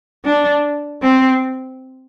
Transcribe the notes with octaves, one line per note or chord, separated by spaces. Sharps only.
D4
C4